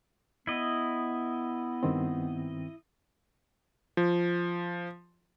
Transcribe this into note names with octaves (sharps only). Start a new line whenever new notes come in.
B3 E4 D#5
G2 D#3 C4
F3